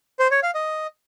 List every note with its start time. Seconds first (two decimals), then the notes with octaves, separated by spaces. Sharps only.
0.19 C5
0.31 C#5
0.43 F5
0.55 D#5